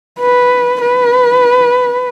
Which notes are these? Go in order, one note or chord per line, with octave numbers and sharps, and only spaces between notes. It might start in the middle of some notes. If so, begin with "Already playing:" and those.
B4
B4